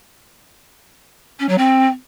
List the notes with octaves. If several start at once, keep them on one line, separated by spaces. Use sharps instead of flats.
C#4
F#3
C4